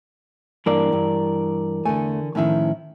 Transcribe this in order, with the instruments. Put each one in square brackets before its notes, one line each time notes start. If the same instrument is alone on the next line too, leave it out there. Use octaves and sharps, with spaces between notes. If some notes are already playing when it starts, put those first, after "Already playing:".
[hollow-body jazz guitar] G2 A#3 D4 [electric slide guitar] E3 A#4 D5
[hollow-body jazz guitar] G2
[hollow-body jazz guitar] E2 A3 [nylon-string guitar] D3 G#5
[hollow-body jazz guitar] A2 D#3 [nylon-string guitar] F3 C#4 E4